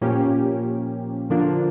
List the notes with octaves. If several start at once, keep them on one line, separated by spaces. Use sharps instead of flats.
A#2 F3 A#3 C#4 G4
D3 F3 A#3 D4 F4